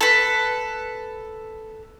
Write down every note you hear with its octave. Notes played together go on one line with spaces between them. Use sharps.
A4 B4